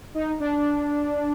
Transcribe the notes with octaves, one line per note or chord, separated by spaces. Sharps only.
D#4
D4